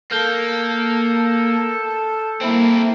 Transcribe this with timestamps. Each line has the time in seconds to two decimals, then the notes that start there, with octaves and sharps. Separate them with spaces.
0.11 A#3 A4 F6 G6 G7
2.41 A#3 C4 E4